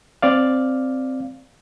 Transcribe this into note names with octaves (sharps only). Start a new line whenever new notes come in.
C4 D5 F5